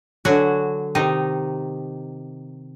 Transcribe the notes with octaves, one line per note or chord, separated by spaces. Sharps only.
D3 F#3 F#4 G#5
C3 D#3 D#4